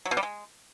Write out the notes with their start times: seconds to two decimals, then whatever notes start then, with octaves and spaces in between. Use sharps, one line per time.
0.05 F#3
0.11 B2
0.17 G3
0.23 G#3